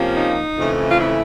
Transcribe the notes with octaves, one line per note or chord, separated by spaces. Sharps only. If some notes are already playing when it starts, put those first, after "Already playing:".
Already playing: C3 F3 A#3 C#4
D#4
F2 C#3 E3 A3
F4
E4